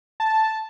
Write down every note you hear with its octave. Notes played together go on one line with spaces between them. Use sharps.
A5